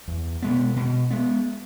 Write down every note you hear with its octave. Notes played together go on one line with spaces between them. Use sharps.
E2
B2 G#3 B3
B2
G#3 B3